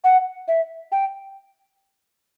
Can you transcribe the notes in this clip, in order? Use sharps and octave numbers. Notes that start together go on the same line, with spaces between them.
F#5
E5
G5